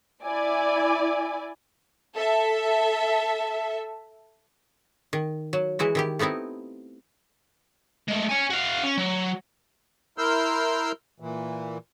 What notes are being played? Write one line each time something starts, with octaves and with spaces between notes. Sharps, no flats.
E4 D5 G#5
A4 E5
D#3
F#3
E3 G#3 E4 F#4
D#3 E4 G4
A3 B3 C4 D#4 E4
G#3 A3
C#5 G#5
F#4 F5
C#4
F#3
E4 A#4 C6 E6 F6 G6
A#2 E3